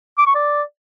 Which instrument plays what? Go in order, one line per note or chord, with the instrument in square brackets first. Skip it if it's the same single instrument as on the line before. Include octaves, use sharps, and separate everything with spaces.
[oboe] D6
C#6
D5